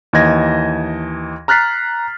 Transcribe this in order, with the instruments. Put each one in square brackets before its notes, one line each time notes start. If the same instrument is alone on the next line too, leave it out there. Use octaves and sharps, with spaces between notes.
[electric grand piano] D#2 E3 D#5 G#6 A#6
A#5 F6 F#6 A6 B6 C7